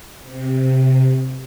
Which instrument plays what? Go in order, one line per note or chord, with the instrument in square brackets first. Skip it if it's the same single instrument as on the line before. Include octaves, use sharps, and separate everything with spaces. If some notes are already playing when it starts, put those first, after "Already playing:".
[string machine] C3